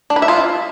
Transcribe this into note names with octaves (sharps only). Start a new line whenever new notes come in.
D4
B4
E5
F4